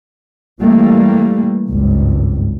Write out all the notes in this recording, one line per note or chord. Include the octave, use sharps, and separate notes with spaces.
E3 G3 A3 A#3
G#1 C#2 G2